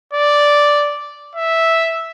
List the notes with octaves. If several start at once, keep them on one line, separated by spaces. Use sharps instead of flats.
D5
E5